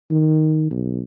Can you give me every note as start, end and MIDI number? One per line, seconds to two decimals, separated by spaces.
0.11 0.67 51
0.71 1.01 35